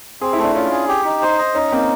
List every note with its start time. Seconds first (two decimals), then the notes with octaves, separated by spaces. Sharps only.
0.21 C4 G#4
0.33 A3 E4
0.44 D4
0.55 C#4 F4
0.71 G#4
0.89 G4
1.05 D#4
1.22 C5
1.39 D#5
1.55 C#4 D#4
1.72 A#3 C4